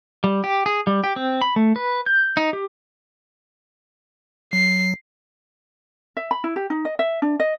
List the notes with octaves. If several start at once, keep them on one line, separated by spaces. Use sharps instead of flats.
G3
G4
G#4
G3
G4
C4
B5
A3
B4
G6
D#4
G4
F#3 C7
E5
B5
E4
G4
D#4
D#5
E5
D4
D#5